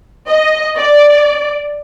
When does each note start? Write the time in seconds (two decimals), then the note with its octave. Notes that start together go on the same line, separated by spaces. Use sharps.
0.28 D#5
0.76 D5